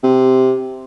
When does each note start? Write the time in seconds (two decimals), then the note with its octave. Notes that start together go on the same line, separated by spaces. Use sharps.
0.03 C3